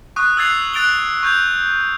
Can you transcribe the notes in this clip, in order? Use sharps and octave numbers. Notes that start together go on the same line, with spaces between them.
C#6 D#6 F#6
E6 F#6 G#6 A6 C7 F7
F#6 A6 D7 F7 G7
C#6 G6 G#6 F7